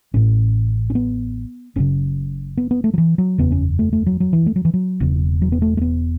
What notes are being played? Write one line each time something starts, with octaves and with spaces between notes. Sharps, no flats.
A1 A2 C#4
C#4
B3
F#1 F#2 C#3 C#4
B3
B3
A3
F#3
E3
F#3
F#1 E2 C#3 B3
C#4
A3
A3
F#3
F#3
E3
A3
F#3
E3
F#3
E1 E2 C#3
F#3
B3
A3
A3
B3